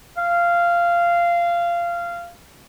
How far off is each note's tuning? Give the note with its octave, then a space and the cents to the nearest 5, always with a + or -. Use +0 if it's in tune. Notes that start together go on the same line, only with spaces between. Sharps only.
F5 -15